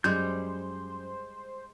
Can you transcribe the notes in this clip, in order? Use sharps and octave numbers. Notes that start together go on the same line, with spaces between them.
F#2 G3 G#3 C5 G6